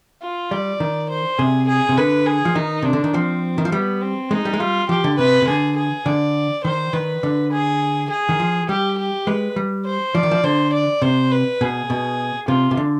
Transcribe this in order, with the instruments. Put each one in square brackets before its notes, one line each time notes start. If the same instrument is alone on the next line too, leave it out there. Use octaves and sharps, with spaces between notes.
[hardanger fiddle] F4
[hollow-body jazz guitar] G3 [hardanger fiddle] D5
[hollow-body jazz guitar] D#3
[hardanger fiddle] C5
[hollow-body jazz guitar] C3 [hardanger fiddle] G#4
[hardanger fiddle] G#4
[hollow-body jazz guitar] C3
[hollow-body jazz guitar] D3 [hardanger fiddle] B4
[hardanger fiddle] G#4
[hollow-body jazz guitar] F3
[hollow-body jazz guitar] D#3 [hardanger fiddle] D#4
[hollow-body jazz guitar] C3 [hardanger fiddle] D4
[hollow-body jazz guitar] D3
D#3
[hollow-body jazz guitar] F3 [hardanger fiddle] C4
[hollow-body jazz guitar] D#3
F3
[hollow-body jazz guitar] G3 [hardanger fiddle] B3
[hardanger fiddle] C4
[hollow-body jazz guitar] G#3 [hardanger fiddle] D#4
[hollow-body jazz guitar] G3
G#3
[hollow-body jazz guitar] G3 [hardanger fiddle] F4
[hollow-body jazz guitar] F3 [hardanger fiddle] G4
[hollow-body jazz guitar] D3
[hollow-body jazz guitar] C3 [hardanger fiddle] B4
[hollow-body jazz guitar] C3
[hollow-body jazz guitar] D3 [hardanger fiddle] G#4
[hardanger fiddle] G#4
[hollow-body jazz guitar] D3 [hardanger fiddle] D5
[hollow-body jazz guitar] D#3 [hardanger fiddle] C5
[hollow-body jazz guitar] D#3 [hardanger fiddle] B4
[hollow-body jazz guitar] D3
[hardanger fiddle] G#4
G#4
[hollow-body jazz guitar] D#3
F3
[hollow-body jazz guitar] G3 [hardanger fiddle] G4
[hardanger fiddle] G4
[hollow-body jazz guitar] G#3 [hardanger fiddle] B4
[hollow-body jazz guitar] G3
[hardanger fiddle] C5
[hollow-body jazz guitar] F3 [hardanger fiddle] D5
[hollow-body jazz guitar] D#3
F3
[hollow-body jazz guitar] D3 [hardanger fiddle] C5
[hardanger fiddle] D5
[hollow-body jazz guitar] C3 [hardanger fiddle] C5
[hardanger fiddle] B4
[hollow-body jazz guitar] B2 [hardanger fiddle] G#4
[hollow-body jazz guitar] B2
[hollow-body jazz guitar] C3 [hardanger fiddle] F4
[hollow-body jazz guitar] C3
D3